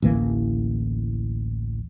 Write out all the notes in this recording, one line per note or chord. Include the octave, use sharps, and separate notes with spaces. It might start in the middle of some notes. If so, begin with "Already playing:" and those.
A1 D2 E3 A#3